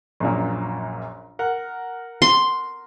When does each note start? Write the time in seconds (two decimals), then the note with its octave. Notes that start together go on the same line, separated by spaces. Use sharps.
0.20 A#1 F#2 A#2
1.39 A#4 F#5
2.22 C6